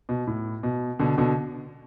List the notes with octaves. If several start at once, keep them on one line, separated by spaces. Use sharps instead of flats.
B2
A2
B2
B2 D3
B2 D3